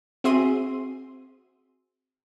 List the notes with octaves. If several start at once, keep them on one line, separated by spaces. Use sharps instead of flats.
C4 F#4 G#4 E5 C6 D#7